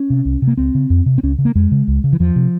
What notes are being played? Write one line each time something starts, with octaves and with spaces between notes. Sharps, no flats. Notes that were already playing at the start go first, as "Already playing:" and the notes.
Already playing: C#4
C3
C2
C3
A#3
C#2 C4
C#3
F2
C3
C4
C#2 C#4
C#3
A#3
F2 G#3
C#3
C#2
C#3
E3
E2 F3
C3